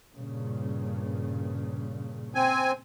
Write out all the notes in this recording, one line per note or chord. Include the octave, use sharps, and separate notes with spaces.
G2 A#2 C#3
C4 G#5